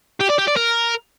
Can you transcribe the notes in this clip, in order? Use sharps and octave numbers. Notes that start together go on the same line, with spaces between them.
G4
D5
G4
D5
A#4